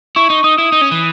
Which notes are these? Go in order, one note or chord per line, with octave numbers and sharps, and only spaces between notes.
E4 C#6
D#4
D#4 D#6
E4 D#6
D#4
C#4
E3